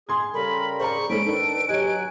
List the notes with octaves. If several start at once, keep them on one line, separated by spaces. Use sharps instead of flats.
G#4 C6 G#6
C#3 G3 A4 A#4 B5
G#4 C5 D5 A#5 C#6
G#3 C#4 D#4 A4 C5 B5 D7
D#3 D4 D#4 A4 B4
F#3 G4 C#5 D#5 G#5 F#6